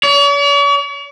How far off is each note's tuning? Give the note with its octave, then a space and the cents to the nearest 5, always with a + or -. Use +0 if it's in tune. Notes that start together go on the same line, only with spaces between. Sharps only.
C#5 +45